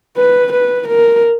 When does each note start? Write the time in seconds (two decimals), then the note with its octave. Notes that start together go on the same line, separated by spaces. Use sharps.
0.17 B4
0.53 B4
0.89 A#4